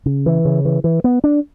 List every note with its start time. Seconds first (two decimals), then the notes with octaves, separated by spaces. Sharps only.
0.06 C#3
0.26 E3
0.45 C#3
0.65 E3
0.84 E3
1.04 B3
1.24 D4